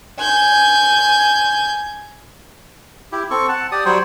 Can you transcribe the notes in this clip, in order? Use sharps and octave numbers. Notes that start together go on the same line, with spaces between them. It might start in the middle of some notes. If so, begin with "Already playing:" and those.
G#5 G6
E4 G4
C4 A4 C#6
F#5 A5
G4 D5 D#6
F#3 G3 C5 C#5